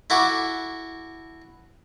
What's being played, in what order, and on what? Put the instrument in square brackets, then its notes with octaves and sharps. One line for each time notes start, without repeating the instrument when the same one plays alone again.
[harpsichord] E4 F#4 A4 D6